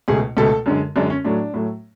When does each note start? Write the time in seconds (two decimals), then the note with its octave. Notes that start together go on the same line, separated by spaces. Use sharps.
0.08 C#2 B2 A3 G#4
0.37 C#2 B2 A3 A4
0.66 F#2 D3 G#3
0.96 F#2 D3 G#3 D4
1.10 C#4
1.24 A2 F#3 A3 D4
1.54 A2 F#3 A3